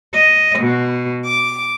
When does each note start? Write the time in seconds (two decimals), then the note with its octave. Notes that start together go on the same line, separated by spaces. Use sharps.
0.14 D#5
0.59 B2
1.26 D6